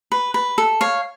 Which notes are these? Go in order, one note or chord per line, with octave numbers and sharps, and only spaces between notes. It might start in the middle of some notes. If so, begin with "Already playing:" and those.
B4
B4
A4
C#5 F5